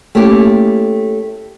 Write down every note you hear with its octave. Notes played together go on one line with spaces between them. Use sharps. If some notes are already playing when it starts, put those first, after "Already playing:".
A3 A#3 C#4 E4 G4